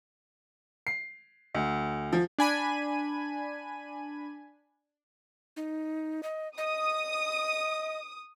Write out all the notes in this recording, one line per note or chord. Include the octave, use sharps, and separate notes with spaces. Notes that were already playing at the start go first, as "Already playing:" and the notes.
C7
D2
F3
D4 G#5 B5 D#7
D#4
D#5
D#5 D#6